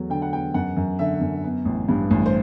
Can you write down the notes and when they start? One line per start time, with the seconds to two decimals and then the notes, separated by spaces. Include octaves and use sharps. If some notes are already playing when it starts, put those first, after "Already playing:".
Already playing: E2 F#3 A3
0.10 D3 G5
0.22 F#5
0.32 E2 G5
0.54 F#2 F#5
0.77 F#2
0.99 D3 E5
1.21 F#2
1.44 B3
1.65 A1
1.89 G2
2.11 A1
2.26 C5